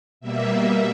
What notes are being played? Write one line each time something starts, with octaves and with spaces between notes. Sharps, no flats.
B2 G3 A#3 E5